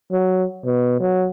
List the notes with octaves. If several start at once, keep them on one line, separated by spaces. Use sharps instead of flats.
F#3
B2
F#3